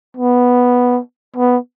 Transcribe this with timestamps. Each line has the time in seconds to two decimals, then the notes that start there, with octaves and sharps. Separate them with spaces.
0.17 B3
1.36 B3